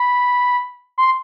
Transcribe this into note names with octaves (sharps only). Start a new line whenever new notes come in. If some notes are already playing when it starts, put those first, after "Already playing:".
Already playing: B5
C6